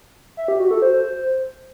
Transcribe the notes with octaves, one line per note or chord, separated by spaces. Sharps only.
E5
G4
F#4
A4
C5